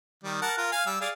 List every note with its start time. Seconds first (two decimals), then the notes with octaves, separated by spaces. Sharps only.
0.23 D#3 G3
0.42 A#4 F#5 A5
0.58 F4 A#4
0.72 F5 G#5
0.86 G3 E6
1.01 G#4 D5 F5